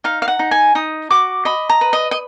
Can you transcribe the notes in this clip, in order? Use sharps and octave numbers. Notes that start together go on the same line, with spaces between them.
D#4 F5
F5
F#5
D#4
G#5
D#4 D#6
F#4 D6
D#5 B5
A#5
B4
D#5
D#5